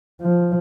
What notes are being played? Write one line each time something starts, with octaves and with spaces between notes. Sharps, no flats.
F3